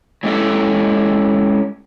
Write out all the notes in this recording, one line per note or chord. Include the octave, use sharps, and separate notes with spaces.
F#3 G#3 C#4 E4 G4 A4